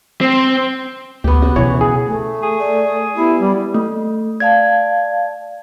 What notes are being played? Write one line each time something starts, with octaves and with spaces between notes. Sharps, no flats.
C4
D2 B3 G4
C#3 F#4
B2 E3 F3 C#5
G#4
A3
G#4
D5
B3 E4 G4
G3
A3
D5 F5 A5 G#6